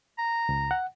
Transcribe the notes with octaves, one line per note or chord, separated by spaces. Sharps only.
A#5
C#2
F#5